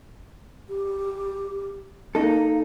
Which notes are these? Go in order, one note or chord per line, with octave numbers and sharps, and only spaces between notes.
G4
A#3 D#4 A4